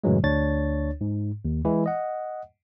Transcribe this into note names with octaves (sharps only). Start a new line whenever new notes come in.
F#2 A2 C#3 E3 F#3 G#3
D2 D4 C#5 A6
G#2
D#2
E3 G#3 E4
D#5 F#5